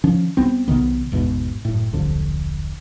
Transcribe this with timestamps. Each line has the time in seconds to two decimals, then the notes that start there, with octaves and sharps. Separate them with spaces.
0.04 D#3 F3 C#4
0.37 C2 B3 C4
0.68 B1 C3 D#3 B3
1.12 G#1 E2 G#2 B2
1.65 F#1 A2
1.93 D#1 B1 F2 D3